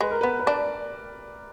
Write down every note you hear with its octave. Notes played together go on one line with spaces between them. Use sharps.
G#3 B4
A#4
B3 B4
B4
D4 D5